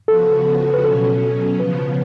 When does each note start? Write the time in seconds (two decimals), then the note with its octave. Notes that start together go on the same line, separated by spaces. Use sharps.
0.08 C#3 F3 B3 F#4 A4
0.74 B4
0.83 B2 F#3 C#4 A4
1.59 C#3 F3 B3 B4